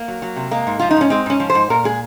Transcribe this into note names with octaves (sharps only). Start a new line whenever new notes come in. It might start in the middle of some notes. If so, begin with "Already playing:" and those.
Already playing: A#3
F#3
F#3
C3
G#3 A#3
G#2
F3 F4
D#4
G#2 C#4
G#3 C4
G#2 C#4
F3
C5
G#2
A#2 A#4
G#3 G#4